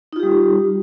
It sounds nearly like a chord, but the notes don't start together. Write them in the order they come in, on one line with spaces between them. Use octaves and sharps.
D#4 F4 G4 G3